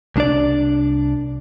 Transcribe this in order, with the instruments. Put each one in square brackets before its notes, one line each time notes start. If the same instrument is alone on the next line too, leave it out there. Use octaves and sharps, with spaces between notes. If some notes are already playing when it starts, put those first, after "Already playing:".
[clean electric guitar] C2 D4 D5